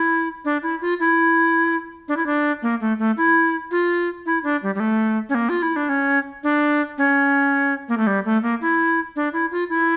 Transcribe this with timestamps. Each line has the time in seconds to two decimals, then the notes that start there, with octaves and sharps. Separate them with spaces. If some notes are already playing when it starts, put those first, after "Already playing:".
Already playing: E4
0.45 D4
0.63 E4
0.81 F4
1.00 E4
2.08 D4
2.17 E4
2.26 D4
2.62 A#3
2.81 A3
2.99 A3
3.17 E4
3.71 F4
4.26 E4
4.44 D4
4.63 G3
4.75 G3
4.80 A3
5.29 C#4
5.35 A#3
5.49 F4
5.62 E4
5.76 D4
5.89 C#4
6.43 D4
6.98 C#4
7.89 A#3
7.98 A3
8.07 G3
8.25 A3
8.42 A#3
8.61 E4
9.16 D4
9.33 E4
9.51 F4
9.70 E4